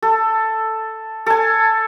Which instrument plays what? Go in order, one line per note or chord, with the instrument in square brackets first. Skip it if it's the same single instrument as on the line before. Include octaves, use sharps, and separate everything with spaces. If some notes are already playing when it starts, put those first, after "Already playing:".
[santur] A4
A4 G#5